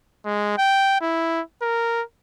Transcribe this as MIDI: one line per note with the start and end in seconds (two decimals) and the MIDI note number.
0.25 0.53 56
0.58 0.97 79
1.01 1.41 64
1.62 2.02 70